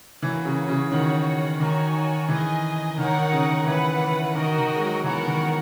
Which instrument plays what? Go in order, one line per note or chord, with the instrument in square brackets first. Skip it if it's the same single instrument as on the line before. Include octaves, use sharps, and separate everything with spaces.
[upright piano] E3 [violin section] A#3 C#4 F#4
[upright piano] C#3
C#3
[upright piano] D#3 [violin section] F#4 C#5 F#5
[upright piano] D#3 [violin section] D#4 F#4 C#5 G#5
[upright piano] E3 [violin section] G#4 D#5 G#5
[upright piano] D#3 [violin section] D#4 A#4 C#5 F#5
[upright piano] D#3
C#3
D#3
[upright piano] E3 [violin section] E4 B4 F#5
[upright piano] E3
[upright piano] D#3 [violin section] F#4 A#4 D#5
[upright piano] D#3
G#3
F#3
[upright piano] E3 [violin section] B3 F#4 A#4 C#5 F#5
[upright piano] D#3